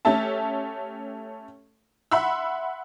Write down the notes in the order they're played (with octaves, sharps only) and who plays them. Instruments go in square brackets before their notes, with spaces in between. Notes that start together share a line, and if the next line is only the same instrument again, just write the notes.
[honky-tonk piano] A3 C#4 G4 A4 E5 A5
E5 F#5 B5 C6 E6